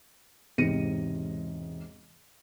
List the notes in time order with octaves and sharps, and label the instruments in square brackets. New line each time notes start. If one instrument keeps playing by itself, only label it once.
[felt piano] E1 G#2 C3 A#6 C#7 D#7